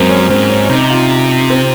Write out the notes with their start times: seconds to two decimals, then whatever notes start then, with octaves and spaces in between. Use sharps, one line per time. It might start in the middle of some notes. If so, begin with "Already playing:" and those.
Already playing: F#2 F#3 G#3 A#3 C4
0.09 C#4
0.22 C#4
0.30 G#2 C4
0.50 C#4
0.65 C#4
0.69 C3 D#4
0.81 D#4
0.90 F4
1.50 C4